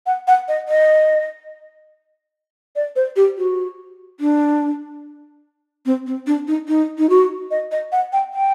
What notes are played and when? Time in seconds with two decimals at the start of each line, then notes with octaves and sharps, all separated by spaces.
0.06 F#5
0.27 F#5
0.48 D#5
0.69 D#5
2.76 D5
2.96 C5
3.16 G4
3.38 F#4
4.20 D4
5.86 C4
6.07 C4
6.27 D4
6.48 D#4
6.68 D#4
6.98 D#4
7.10 F#4
7.51 D#5
7.72 D#5
7.92 F#5
8.13 G5
8.34 G5